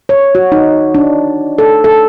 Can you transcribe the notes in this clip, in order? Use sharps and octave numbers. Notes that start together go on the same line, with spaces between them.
C#5
F#4
D#4
D4
A4
A4